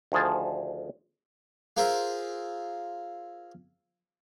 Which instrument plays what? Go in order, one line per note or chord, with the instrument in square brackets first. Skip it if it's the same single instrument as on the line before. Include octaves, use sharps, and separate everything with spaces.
[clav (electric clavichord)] D2 D#3 F3 G#4 A5
[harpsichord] F4 G#4 A#4 C5 E5